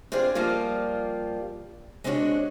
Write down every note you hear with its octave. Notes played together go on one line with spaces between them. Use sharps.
C4 D4 F4 G#4 C5
F3 G3 A#3 F4 D5
G#3 B3 C4 D4 F#4 C#5